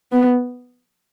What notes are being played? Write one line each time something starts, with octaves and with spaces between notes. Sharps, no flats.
B3